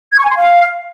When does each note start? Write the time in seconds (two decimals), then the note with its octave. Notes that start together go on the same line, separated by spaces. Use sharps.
0.12 G#6
0.18 C#6
0.24 G#5
0.30 C6
0.36 F5